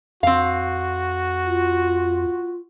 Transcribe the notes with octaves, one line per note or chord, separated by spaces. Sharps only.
F2 C4 F#4 F5
F4